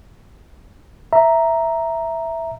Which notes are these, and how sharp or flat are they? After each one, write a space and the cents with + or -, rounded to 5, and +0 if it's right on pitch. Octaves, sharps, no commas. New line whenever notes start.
E5 +0 A#5 +0